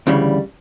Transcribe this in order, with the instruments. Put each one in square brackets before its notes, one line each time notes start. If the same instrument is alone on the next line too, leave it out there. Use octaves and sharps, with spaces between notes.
[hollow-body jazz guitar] D2 C#3 E3 G3